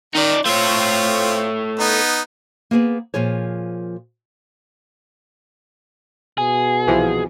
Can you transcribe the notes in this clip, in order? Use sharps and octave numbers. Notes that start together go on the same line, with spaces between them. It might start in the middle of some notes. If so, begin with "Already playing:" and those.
D#3 D#4 D5
A3 C4 F4 C#5
B3 D#4
A#3 B3 G#4 B4
A#2 F3 F4 G#4 C#5
B2 G#4
C2 E3 F3